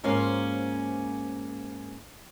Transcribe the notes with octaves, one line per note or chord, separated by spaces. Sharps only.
G#2 A#3 C#4 F4 C5 F5